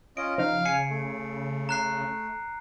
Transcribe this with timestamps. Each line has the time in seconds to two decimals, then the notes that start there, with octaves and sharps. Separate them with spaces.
0.17 C#4 F4 D#5 D7
0.38 C#3 F3 D#4 F5
0.65 G#5 C7 C#7
0.90 A3
1.69 A#5 F#6 C7